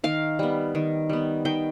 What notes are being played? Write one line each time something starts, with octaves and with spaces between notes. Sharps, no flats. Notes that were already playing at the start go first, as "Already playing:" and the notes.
D#3 F5
G3 B3
D#3
G3 B3
D#3 G5